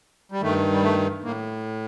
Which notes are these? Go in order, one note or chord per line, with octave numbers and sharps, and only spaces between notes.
G3
G2 D#3 A3
G3
A3
A2 A#3